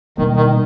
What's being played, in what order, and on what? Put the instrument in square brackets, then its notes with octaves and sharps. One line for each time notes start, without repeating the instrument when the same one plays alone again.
[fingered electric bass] B2 G3 A#3 [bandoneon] D#3
[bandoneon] D#3